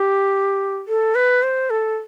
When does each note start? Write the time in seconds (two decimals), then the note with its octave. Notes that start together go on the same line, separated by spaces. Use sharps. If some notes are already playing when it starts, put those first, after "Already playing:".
Already playing: G4
0.88 A4
1.15 B4
1.43 C5
1.70 A4